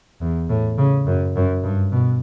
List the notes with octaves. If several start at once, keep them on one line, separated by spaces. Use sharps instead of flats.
E2
A2
C#3
F#2
F#2
G2
B2